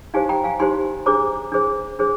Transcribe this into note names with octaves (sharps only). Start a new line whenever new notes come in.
D#4 G4 C5 F5 G#5
G5 A#5
F5 G#5
D#4 G4 C5 G#5 C6
D4 G#4 C5 A#5 D6
D4 G#4 C5
D4 G#4 C5